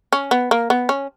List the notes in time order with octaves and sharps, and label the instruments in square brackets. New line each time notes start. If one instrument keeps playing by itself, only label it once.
[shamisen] C#4
B3
A#3
B3
C#4